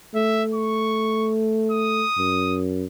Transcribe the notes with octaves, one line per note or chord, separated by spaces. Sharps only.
A3 E5
C#6
D#6
F#2